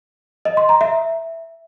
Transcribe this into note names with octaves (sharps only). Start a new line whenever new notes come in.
D#5
C6
A#5
E5